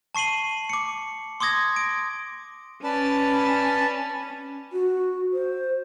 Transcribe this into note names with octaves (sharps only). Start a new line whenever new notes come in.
A5 C#6 C7 D#7 F#7
D6 C#7
C6 D6 D#6 G#6 A#6
D7
C#4 B4 D5 A5
F#4
C5